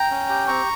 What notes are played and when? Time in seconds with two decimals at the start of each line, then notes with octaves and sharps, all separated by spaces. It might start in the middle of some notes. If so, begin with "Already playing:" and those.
Already playing: G5 A#5
0.11 C#4
0.29 G4
0.48 C4 A#5 C#6